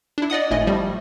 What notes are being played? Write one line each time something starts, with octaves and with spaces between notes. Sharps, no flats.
D4 E4
D5 D#5 F#5 D#6
G#1 A2 A3 D#5 G#5
F3 G3 A3